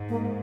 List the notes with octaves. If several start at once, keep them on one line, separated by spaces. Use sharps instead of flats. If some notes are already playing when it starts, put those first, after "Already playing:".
Already playing: G#2
A#3